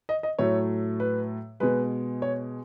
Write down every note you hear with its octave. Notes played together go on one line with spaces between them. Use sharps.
D#5
D#5
A2 F#3 A3 C#5
B4
B2 G#3 B4
C#5